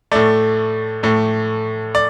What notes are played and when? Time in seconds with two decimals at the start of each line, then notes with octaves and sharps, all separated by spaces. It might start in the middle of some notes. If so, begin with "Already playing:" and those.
0.11 A2 A3 D5
1.03 A2 A3
1.95 D5